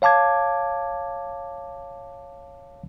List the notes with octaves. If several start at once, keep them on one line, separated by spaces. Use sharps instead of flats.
C#5 F5 A5 D6 G#6